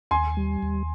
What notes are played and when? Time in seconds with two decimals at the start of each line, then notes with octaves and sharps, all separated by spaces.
0.11 D#2 G#5 C6
0.37 G3
0.63 D#2